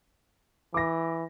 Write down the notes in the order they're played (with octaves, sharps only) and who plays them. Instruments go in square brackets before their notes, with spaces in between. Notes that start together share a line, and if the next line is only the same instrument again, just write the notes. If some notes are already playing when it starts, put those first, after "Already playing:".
[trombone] E3 [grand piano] D6 A#6